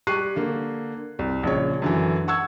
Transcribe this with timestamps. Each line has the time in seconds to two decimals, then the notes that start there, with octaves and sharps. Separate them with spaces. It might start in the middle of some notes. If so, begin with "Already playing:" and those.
0.07 G3 G4 C#6 F#6 C7 D#7
0.36 D3 A#3
1.19 C2
1.43 A#1 C#3 C#5
1.82 F#2 D3 E3
2.28 F#5 C#6 E6 G#6